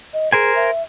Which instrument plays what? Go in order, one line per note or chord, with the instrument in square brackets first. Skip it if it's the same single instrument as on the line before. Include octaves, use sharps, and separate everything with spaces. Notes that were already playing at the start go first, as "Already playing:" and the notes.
[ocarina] D#5
[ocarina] G#4 [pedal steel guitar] A#4 C5 G#5
[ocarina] E5